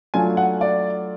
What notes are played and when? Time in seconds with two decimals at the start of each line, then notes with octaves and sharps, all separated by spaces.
0.14 F#3 A3 D4 F4 G#5
0.37 F#5
0.61 D5